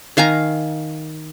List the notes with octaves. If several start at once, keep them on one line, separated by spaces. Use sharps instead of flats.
D#3 F5 G#5 A#5